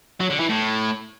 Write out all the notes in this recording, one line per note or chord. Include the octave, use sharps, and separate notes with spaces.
F#3
D3
E3
A2